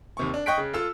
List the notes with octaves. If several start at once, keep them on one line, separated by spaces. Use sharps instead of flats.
D#2 C3 C#6
D4
D#5 G5 C#6 F#6 B6 D7
C#3
F4 A4 E6